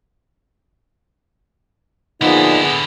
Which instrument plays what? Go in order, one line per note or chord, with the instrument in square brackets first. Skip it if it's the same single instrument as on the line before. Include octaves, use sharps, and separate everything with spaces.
[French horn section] A#2 F3 D#4 [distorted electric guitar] D3 E4 [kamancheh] B3 G#4